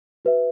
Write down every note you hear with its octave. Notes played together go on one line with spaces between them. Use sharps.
F#4 B4 E5